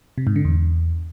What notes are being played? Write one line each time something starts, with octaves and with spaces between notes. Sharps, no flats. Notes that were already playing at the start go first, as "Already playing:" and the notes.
C3
G#2
D3
E2